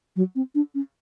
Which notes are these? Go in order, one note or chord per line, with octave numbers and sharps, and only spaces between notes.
F#3
C4
D4
C#4